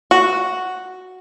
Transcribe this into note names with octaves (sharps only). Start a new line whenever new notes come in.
F#4